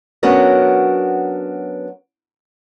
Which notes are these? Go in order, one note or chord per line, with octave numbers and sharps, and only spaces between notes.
F#3 B3 C#4 D4 F#4 A#4